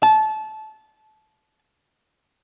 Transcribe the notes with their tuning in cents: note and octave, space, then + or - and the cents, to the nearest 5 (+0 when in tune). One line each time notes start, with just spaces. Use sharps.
A5 -25